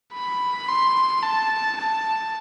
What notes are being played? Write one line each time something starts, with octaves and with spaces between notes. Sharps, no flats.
B5
C6
A5
A5